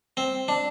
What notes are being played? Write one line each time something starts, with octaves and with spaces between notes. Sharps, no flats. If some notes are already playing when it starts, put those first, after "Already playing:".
C4
D4